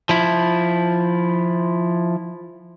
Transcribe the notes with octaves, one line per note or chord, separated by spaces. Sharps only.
F3 E4